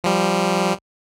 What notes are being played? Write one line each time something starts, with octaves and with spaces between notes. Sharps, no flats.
F3 G3